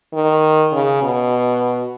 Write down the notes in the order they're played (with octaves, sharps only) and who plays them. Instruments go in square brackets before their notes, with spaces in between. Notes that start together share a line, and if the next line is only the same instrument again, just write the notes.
[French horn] D#3
C#3
B2